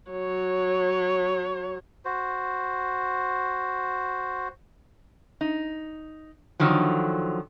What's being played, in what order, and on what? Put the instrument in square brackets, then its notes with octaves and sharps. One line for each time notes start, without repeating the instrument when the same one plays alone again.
[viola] F#3 C#5
[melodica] F#4 C5
[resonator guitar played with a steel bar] D#4
D3 D#3 F3 F#3